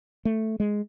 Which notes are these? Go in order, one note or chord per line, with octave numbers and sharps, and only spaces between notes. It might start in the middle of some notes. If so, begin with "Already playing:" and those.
A3
G#3